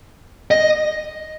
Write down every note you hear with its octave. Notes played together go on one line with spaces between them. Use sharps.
D#5